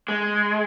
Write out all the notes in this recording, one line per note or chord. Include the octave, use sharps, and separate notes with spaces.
G#3